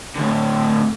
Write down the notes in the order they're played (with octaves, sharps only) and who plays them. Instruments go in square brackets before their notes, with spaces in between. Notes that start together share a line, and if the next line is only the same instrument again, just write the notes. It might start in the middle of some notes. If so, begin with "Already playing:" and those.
[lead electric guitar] A2 D3